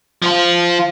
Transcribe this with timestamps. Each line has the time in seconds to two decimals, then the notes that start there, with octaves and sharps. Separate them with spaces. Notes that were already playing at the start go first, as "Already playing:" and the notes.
0.22 F3 F4